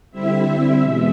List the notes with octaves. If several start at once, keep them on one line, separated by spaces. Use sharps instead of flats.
D3 G3 C4 E4 E5
E2 B2 G#3